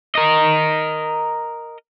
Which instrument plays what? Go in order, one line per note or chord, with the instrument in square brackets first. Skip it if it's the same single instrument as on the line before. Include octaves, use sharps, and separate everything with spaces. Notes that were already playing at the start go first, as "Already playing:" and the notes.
[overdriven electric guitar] A#4 D#5